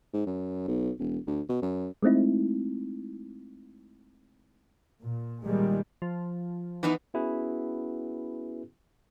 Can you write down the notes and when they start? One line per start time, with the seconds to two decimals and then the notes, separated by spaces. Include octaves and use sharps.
0.13 G#2
0.26 F#2
0.68 B1
0.99 E1
1.27 D2
1.49 B2
1.62 F#2
2.03 G#3 A3 C4 D#4 E4
5.00 A#2
5.45 A#2 D#3 G3 G#3
6.02 F3
6.83 E3 B3 D#4
7.14 B3 C#4 E4 F#4 G#4 B4